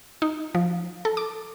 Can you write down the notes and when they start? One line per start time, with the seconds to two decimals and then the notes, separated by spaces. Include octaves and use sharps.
0.22 D#4
0.55 F3
1.05 A4
1.17 D6